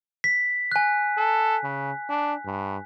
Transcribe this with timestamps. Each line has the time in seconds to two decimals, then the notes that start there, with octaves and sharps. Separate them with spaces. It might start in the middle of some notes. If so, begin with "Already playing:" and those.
0.24 B6
0.72 G#5 F#6
1.18 A4
1.63 C#3
2.10 D4
2.46 G2